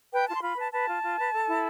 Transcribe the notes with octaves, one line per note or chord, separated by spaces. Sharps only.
B4 G5
F4 A5
C6
F4 B5
B4 A5
B4 A5
F4
F4
B4
A4
E4